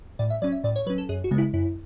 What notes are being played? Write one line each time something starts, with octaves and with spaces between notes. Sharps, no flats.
A2 D5
E5
F#3 C#4 D5
E5
A2 D5
C#5
F#3 C#4 B4
A4
F#2 G#4
F#4
C#3 G#3 B3
E4
F#2 E4